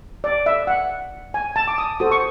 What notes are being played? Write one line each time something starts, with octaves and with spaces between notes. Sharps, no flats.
D5
E5
F#5
G#5
A5
D6
D#6
F#4 A4 C5 D#6
C#6